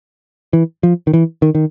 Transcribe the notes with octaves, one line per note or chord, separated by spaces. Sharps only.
E3
F3
D#3
E3
D#3
D#3